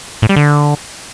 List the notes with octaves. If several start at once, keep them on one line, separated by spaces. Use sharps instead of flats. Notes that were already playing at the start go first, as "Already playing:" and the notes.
A2
G3
D3